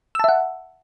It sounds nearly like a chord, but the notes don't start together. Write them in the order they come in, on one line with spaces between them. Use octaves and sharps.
E6 A5 E5 F#5